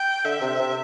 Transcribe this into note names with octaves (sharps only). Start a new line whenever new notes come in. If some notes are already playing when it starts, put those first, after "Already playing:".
Already playing: G5
D3 E5
C3
C3